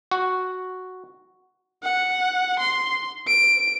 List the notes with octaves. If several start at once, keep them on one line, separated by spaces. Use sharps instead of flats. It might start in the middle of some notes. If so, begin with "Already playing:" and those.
F#4
F#5
C6
D7